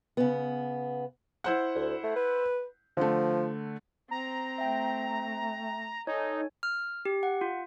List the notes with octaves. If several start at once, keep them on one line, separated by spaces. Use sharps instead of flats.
C#3 B3
E4 C5 F#5
D2
A3
B4
D3 F3 A3
C4 A#5
A3 E5 G5
D#4 A4 C#5 G#5
F6
G4
F#5
F4